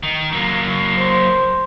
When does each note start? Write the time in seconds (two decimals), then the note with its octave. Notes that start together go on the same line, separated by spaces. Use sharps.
0.03 D#3
0.33 F#3 A#3
0.99 C5